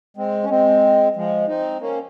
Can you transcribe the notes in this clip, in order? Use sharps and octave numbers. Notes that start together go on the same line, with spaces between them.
G#3 C4
C#4
G#3 C4
F3 G#3
C4 D#4
A#3 C#4